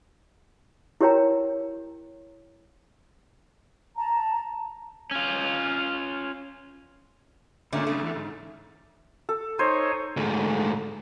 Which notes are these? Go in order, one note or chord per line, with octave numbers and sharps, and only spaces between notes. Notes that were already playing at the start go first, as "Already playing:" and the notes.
E4 G4 A#4 C#5 G5 A#5
A5 A#5
C#4 F4
G#2 D3 A3 A#3 C#4
B1 C#3 A3
E2 E3
G#2
A4
D#4 C5 C#5 G#5
D2 G#2